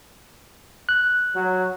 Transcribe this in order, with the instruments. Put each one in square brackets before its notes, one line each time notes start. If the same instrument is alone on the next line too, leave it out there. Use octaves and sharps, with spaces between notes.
[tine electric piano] F#6
[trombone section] F#3